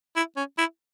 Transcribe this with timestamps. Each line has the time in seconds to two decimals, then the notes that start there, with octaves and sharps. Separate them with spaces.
0.16 E4
0.37 C#4
0.58 E4